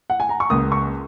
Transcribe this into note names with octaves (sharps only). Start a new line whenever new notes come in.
F#5
G#5
A#5
C#6
C#2 C#3 A#3 D#6
C#6